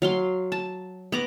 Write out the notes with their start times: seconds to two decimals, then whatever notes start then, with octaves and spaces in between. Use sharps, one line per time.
0.02 F#3 F5 C6
0.52 A5
1.12 B3 A#5 D6